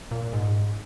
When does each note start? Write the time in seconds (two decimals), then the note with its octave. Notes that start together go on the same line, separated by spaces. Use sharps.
0.11 A#2
0.33 G#2